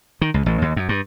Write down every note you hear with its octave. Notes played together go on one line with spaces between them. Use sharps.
D#3
C#2
A1
D#2
F#2
G2